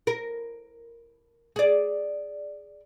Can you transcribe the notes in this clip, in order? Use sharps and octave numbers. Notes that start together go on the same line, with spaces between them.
A#4
G#4 D5